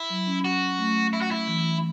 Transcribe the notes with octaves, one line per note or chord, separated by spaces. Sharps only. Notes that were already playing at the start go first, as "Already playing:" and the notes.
Already playing: E4
F#3
C#4
F#4
A3
E4
F#4
E4
E3